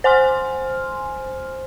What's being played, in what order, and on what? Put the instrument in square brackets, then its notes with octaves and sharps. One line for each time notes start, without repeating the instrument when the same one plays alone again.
[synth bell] C5 G#5 C6 F6